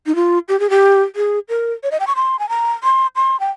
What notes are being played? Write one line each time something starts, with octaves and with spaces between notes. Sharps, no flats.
D#4
F4
G4
G#4
G4
G#4
A#4
C#5
D#5
G5
C#6
C6
G#5
A#5
C6
C6
G5